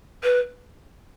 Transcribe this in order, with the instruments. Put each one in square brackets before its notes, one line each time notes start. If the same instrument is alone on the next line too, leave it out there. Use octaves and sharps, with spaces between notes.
[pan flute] B4